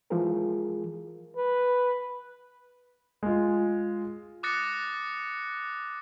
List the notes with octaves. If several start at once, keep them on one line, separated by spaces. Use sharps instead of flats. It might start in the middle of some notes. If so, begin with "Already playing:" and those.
E3 F3 G#3 F4 G#4 A#4
B4
G#3 F4
D6 D#6 F#6 A6 A#6 C#7